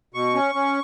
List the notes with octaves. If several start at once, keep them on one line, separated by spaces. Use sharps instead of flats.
B2 C#6
C#4
C#4